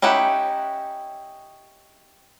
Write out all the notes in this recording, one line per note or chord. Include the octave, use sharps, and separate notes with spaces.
C#4 D#4 E4 G4 F#5